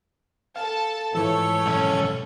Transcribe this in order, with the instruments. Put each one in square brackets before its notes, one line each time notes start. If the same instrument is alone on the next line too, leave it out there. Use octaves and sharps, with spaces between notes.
[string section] A4 A5 [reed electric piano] F5
[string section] G#1 A3 C#5 [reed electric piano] E3 F3 [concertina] A4
[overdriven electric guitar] B1 C#4